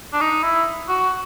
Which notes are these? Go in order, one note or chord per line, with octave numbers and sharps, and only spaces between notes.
D4
D#4
E4
F#4